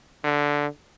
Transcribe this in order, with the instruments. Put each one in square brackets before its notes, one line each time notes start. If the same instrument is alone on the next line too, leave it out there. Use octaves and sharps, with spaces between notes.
[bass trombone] D3